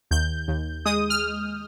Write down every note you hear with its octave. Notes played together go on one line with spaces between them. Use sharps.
D#2 G6
D#2
G#3 D#6
F6